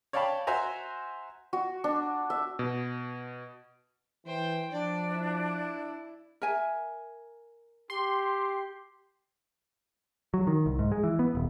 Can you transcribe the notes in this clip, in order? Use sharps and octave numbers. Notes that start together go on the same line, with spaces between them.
C#5 D5 F5 G5 A5 B5
F#4 C5 E5 G#5 A#5
F#4
D4
E5
B2
E3 C5 G5
F3 D4 D5
E4
A#4 E5 G#5
G4 C6
F#3
D#3
C2
G#2
G#3
E3
B3
D#1